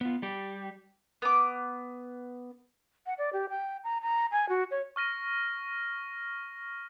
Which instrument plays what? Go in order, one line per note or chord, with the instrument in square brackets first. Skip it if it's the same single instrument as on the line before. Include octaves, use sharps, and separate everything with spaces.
[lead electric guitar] B3 F4
G3 G4
[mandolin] B3 D6
[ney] F#5
D5
G4
G5
A#5
A#5
G#5
F#4
C#5
[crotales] C#6 F6 A#6 D#7